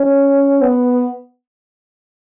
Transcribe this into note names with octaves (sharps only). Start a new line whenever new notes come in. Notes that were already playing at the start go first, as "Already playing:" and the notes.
Already playing: C#4
B3